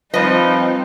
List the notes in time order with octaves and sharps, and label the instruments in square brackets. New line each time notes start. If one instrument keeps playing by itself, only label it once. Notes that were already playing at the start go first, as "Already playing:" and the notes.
[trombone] F3 [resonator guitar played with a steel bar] G3 D#5 [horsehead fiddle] C4 D#4 [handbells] B4